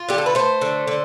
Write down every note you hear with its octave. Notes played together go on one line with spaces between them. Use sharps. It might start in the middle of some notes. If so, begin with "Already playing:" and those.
Already playing: F4
D3 G4
A4
B4
A3 C5
D3
D3